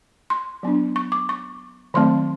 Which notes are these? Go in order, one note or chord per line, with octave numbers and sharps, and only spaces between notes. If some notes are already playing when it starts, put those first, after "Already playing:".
C6
F#3 B3 D4
C#6
D6
C#6
D#3 F#3 A3 C4 C6